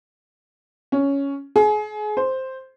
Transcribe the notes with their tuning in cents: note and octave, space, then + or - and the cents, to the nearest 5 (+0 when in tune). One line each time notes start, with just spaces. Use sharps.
C#4 +5
G#4 +30
C5 +0